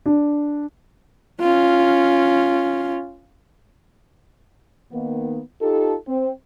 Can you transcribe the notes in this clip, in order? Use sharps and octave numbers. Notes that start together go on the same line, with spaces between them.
D4
C#4 F4
D#3 A#3 B3
D#4 F4 G4 A4
C4